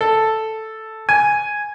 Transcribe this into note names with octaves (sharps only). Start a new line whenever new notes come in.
A4
G#5